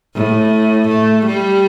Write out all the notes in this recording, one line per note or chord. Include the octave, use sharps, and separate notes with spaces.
A2
A3
G3